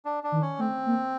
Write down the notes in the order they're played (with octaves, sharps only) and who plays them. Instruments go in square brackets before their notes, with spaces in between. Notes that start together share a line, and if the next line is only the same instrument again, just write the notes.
[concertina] D4
D4
[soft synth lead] D#3
[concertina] C#4
[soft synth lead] A3 [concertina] C4
[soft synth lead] A#3